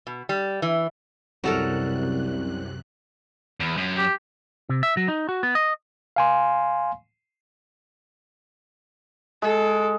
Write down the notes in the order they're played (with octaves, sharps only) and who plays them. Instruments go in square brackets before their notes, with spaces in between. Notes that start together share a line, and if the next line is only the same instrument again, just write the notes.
[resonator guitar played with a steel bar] B2
G3
E3
[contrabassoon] C2 [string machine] F#2 C3 F#6 [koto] F#3 A4 A#4
[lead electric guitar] E2
F#2
[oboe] G4
[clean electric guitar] C3
E5
F#3
D#4
F#4
B3
D#5
[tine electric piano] F5 G#5 C6
[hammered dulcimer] G#3 [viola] A4